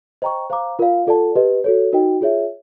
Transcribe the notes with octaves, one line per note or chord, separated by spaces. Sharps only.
C5 D#5 G5 A#5 C#6
C5 F5 A#5 D6
F4 A#4 D5 F5
F4 A4 D5 F#5 A5
G4 B4 D#5
F#4 A4 C#5
D#4 F#4 A#4 D#5 G5
F4 G#4 C#5 E5